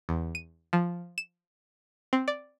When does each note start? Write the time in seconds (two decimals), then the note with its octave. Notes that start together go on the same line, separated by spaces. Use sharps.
0.09 E2
0.35 D#7
0.73 F3
1.18 E7
2.13 C4
2.28 D5